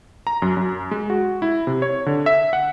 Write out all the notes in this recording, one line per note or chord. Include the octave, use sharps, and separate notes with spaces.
A#5
F#2
F#2
G#3
F#4
E4
C3
C#5
D3
E5
F#5